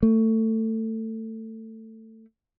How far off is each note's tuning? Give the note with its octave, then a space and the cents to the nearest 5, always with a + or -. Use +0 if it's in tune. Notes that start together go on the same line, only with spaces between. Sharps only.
A3 +20